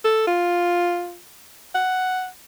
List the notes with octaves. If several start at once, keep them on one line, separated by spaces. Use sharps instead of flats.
A4
F4
F#5